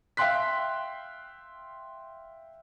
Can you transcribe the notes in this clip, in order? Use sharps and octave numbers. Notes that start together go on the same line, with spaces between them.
E5 F5 G5 C6 F#6 B6